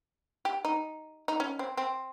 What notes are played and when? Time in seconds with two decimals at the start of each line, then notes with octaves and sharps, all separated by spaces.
0.45 G4
0.65 D#4
1.28 D#4
1.40 C#4
1.59 C4
1.77 C4